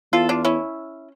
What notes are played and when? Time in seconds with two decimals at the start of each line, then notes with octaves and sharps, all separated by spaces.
0.12 E2 F4 A4
0.29 D4 F4
0.45 C#4 E4